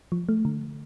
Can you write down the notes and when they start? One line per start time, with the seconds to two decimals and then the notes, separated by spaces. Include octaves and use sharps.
0.12 F3
0.29 A3
0.45 D3